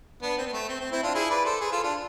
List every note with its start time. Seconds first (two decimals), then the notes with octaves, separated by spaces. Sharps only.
0.22 B3 D4
0.38 C4
0.47 B3
0.53 A3
0.69 C4
0.80 C4
0.92 C4 E4
1.03 D4 F4
1.15 E4 G#4
1.30 B4 D5
1.45 A4 C5
1.61 G#4 B4
1.72 F4 A4
1.84 D4 F4